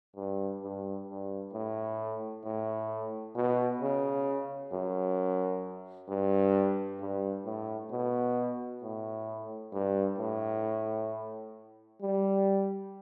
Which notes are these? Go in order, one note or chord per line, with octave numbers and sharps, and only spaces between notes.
G2
G2
G2
A2
A2
B2
C#3
F#2
G2
G2
A2
B2
A2
G2
A2
G3